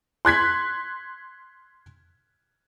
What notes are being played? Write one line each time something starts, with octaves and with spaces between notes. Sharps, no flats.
C6 F#6 G#6 B6